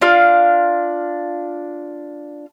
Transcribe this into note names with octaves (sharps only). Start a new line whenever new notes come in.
D4 F4 F5